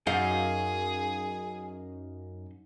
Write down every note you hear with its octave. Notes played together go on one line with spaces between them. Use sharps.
F#2 D#4 G#4 D#5 F5